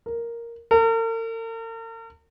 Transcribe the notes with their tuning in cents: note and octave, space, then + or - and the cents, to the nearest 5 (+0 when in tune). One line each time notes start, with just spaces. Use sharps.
A#4 +0
A#4 -45